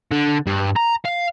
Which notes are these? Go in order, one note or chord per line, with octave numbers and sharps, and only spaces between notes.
D3
G2
A#5
F5